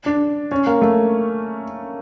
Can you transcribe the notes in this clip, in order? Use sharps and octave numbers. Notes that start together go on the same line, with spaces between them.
D4
C#4
A#3
A3